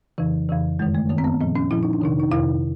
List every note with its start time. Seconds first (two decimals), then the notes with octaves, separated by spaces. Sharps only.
0.18 F2 C#3 E3
0.49 F2 C#3 E3
0.79 F#2 D#3 G#3
0.95 A3
1.09 F#2 D#3 A#3
1.18 C4
1.24 B3
1.41 A#2 F3 C4
1.56 C#4
1.71 A#2 F3 E4
1.83 D#4
1.93 D4
2.01 F2 C3 D#3 D#4
2.20 D#4
2.31 F2 C3 D#3 E4